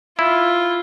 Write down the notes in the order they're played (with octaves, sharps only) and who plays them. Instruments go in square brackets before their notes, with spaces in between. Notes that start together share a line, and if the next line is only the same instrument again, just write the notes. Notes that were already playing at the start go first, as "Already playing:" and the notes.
[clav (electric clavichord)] E4 [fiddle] F4